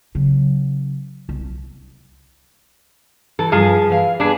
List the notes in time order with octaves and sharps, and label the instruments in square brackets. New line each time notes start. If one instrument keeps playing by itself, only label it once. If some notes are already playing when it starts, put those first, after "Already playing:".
[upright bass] C#3 F#3
C2
[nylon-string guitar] E3 [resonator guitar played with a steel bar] A4
[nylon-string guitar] G2 [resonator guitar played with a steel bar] F3 G#4
[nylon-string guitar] E3 F5
[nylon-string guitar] B3 B4 [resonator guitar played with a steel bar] D4 G#4